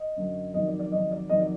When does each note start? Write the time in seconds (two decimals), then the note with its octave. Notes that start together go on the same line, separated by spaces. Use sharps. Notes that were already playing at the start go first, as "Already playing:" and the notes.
Already playing: D#5
0.16 F#2 D3 F#3
0.54 F2 D#3 F#3 D#5
0.67 D5
0.79 D5
0.92 F2 D#3 F#3 D#5
1.11 D5
1.29 F2 D#3 F#3 D#5
1.40 D5